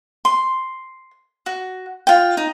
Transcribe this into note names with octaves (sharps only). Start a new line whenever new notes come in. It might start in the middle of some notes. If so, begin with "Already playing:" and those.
C6
F#4
F4 G5
D#4